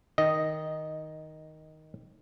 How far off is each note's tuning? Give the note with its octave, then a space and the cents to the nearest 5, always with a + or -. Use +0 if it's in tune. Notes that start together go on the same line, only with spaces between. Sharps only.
D#3 +10 D#5 +0